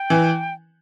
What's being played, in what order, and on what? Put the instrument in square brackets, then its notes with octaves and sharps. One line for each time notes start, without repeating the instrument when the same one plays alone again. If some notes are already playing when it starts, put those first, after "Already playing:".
Already playing: [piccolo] G5
[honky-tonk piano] E3